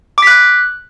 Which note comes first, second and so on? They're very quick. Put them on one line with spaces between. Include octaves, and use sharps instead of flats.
D6 B6 F#6